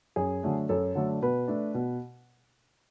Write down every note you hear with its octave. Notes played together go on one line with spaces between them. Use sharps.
F#2 G#4
D3 F#3 A3 D4
F#2 A4
D3 F#3 A3 D4
B2 B4
A3 D4
B2